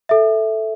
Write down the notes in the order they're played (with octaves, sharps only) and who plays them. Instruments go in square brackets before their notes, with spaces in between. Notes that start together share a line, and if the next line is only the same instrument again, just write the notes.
[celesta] A4 E5